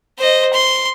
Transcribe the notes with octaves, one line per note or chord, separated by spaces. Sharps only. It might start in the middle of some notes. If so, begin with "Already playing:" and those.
C5 D#5
C6